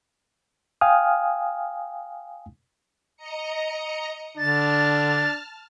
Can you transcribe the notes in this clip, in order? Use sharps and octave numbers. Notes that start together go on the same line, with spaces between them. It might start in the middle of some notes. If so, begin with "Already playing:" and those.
F5 G5 G#5 D#6 F6
D#5 A#5 C#7
D3 D4 A5 F6 A6